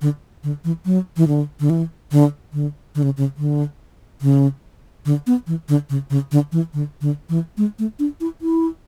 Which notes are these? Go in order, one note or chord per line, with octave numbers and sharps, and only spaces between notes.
D3
D3
E3
F#3
E3
D3
D3
E3
D3
D3
D3
C#3
C#3
D3
C#3
D3
B3
E3
D3
C#3
C#3
D3
E3
D3
D3
E3
G#3
A3
D4
E4
E4